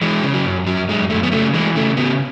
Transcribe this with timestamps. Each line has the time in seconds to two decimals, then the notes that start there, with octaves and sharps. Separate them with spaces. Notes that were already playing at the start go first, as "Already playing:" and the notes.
0.01 E3 G#3
0.23 C#3
0.34 F#3
0.45 F#2
0.67 F#2 F#3
0.89 F#2 G#3
1.10 F#2 A3
1.23 B3
1.31 C#3 A3
1.54 E3 G#3
1.75 C#3 A3
1.97 C#3 B3